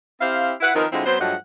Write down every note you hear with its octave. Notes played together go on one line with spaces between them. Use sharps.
C4 E4 G4 C5 F5
E4 B4 F#5
D#3 F3 C4 D#4 A#4 B4
D3 F#3 G#3 C4 E4 F4
F#3 B3 C4 C5
G2 F3 F#3 A3 D#5 F#5